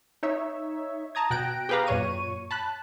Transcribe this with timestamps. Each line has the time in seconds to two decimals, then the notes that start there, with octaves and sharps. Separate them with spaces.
0.23 D#4 C#5 E5
1.15 A5 A#5 D#6 G#6
1.30 B2 G5 F#6 A#6 D7
1.69 G4 G#4 B4 F5 A#5
1.87 F#2 A#2 C#5 C#6 D#7
2.51 A5 B5 F#6